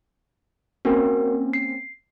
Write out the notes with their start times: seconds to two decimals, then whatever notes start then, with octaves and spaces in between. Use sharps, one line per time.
0.85 A#3 C4 C#4 F#4 A#4
1.53 C7